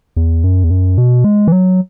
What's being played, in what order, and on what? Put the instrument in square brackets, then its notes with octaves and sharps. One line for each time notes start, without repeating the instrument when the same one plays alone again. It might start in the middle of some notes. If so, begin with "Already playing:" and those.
[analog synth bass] E2
F#2
E2
F#2
B2
G#3
E3
F#3